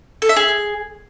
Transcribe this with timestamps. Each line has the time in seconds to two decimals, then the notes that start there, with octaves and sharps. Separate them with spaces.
0.22 A4
0.29 E5
0.36 G#4